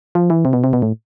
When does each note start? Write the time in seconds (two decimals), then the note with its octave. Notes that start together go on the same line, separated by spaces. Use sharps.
0.15 F3
0.30 E3
0.45 C3
0.53 B2
0.64 C3
0.73 B2
0.82 A2